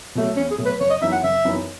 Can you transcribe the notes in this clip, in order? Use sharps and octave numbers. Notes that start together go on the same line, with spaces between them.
B2 F#3 A3
E2 C#4
G#4
B2 F#3 A3
B4
F#1 C#5
D#5
F#2 E3 B3 D#4 E5
F#5
F#1 E5
F#2 E3 B3 D#4